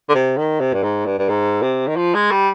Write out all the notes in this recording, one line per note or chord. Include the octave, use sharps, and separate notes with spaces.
D3
C3
D#3
C3
G2
G#2
G2
G2
G#2
C3
D#3
F3
G#3
G3